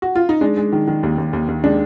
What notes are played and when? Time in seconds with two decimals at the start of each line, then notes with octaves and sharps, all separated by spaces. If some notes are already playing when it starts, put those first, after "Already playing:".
0.02 F#4
0.15 F4
0.29 D#4
0.41 G#3 D4
0.57 G#3
0.73 D#3
0.88 D#3
1.03 D#2
1.18 D#2
1.33 D#2
1.48 D#2
1.64 G#3 D4